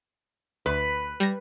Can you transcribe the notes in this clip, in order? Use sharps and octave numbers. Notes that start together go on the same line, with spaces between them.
D2 B4
G3 A#6